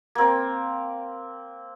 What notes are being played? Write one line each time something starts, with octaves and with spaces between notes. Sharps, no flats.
A#3 C4